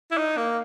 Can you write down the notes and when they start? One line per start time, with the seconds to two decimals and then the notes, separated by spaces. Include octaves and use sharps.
0.11 E4
0.17 D#4
0.37 A#3